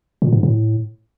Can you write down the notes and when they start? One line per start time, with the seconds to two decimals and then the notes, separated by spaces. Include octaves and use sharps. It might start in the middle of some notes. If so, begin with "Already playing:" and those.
0.22 A#2
0.33 G#2
0.43 A2